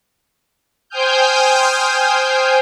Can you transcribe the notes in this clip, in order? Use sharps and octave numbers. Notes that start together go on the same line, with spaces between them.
C5 G5 G#5 D#6 F6 G6